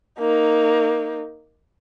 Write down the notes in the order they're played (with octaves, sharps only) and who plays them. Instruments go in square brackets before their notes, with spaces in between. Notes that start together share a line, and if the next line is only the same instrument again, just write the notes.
[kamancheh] A#3 D#4